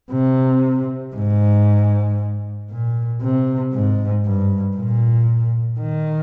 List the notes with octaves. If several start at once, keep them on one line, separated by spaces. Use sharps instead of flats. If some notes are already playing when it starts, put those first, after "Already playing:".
C3
G#2
A#2
C3
G#2
G2
A#2
D#3